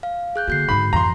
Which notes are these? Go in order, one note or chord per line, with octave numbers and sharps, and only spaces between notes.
F5
G#4 F#6 G6
D3 A#3 F#4 G6 C7
G#2 D3 B5
F2 E3 A#5 C6